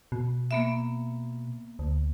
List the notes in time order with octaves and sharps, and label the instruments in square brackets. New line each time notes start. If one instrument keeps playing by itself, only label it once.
[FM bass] B2
[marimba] A#3 B3 E5
[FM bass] D2